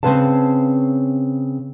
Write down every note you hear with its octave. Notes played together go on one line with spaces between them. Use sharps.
C#3 G#3 C4 B4 F5 A5